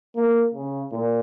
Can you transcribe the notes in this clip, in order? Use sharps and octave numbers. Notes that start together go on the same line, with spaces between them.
A#3
C#3
A#2